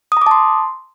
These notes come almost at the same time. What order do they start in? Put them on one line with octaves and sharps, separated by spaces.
D#6 A#5 D6 A5 C6